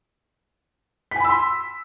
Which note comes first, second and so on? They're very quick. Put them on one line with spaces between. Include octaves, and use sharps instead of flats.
B6 G#5 B5 E6 C6